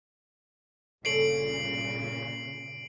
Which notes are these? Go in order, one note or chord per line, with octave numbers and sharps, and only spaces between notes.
G1 A#2 C#3 A4 C#5 C7 D7 F#7